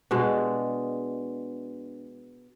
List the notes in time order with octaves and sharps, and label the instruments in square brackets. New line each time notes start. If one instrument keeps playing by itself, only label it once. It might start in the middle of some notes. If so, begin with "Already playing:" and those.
[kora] B2 G#3 D4